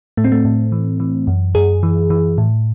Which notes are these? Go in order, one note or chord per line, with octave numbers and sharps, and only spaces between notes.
A2 A3
C4
A3
A2
E3
E3
F#2
F#2 G#4
E3
E3
A2